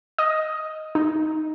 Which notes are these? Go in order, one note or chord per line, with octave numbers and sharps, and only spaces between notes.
D#5
D#4